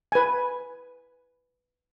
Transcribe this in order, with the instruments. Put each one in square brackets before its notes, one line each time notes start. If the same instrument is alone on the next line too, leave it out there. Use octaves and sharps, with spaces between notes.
[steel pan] B4 G#5